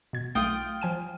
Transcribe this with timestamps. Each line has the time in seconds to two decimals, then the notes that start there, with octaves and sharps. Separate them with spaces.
0.13 B2 G#6
0.35 B1 A3 F4 G5 D#6
0.82 F3 G#5 D#7